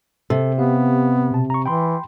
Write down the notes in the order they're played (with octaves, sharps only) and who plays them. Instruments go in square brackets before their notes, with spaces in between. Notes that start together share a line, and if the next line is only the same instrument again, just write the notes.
[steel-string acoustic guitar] C3 [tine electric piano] A4
[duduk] B3 [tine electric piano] G4 F5
[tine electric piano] B2 A5
A#5 C#6
[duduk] E3 [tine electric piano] G5 B5 C6